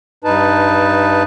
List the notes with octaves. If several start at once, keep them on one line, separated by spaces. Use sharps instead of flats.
G2 D#4 B4 A5